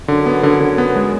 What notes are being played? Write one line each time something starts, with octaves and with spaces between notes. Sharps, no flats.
F#2 D3
B3
D3
D3
B3
G#3